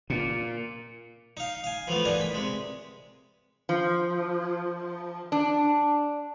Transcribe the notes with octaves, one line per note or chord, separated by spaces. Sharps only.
A#2
D#4 F5
F5 G#5
E3 F3 A3 B3
G2 A#3 D4 D#4 G#5
B5
C3 G#3
F3
D4